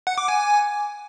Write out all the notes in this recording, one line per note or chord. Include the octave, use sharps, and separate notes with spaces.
F#5
D6
G#5